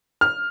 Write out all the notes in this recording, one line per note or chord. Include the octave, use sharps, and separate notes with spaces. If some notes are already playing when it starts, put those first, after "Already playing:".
F6